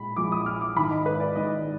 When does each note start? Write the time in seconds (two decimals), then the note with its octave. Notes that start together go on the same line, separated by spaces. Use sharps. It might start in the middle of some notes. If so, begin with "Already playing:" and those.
Already playing: A#2 G#3 B5
0.16 A#1 A#2 G#3 D6
0.32 D#6
0.46 F6
0.61 D6
0.75 G#1 G#2 D#3 G#3 B5
0.91 D#5
1.06 B4
1.20 D5
1.35 G#1 G#2 D#3 G#3 D#5